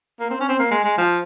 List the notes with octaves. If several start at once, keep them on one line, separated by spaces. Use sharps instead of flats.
A#3
C4
C#4
C4
A#3
G#3
G#3
F3